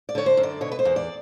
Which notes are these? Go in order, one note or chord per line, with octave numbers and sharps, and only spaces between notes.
D5
D3 C#5
C5
F#2
D5
B2 C#5
B4
C5
E2
D5